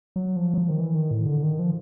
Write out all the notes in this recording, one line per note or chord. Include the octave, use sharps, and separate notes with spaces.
F#3
F3
F#3
F3
D#3
E3
D#3
A2
D3
D#3
F3